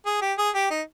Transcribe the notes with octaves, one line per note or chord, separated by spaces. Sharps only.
G#4
G4
G#4
G4
D#4